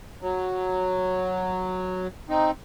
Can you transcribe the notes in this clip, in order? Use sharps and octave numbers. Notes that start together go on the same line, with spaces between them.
F#3
C4 D#4